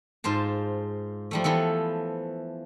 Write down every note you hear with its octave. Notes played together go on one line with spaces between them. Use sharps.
G#2 F4 C5 A5
F3 G3 A3
E3 F3 B3 A4